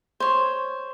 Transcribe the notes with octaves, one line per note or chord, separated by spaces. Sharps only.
C5 C#5